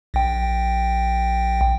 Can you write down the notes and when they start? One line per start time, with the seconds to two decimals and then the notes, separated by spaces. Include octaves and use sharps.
0.14 A#1 G5